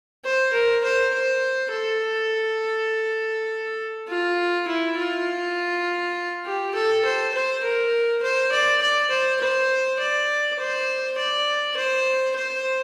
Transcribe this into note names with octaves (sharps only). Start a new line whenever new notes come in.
C5
A#4
C5
C5
A4
F4
E4
F4
G4
A4
C5
C5
A#4
C5
D5
D5
C5
C5
D5
C5
D5
C5
C5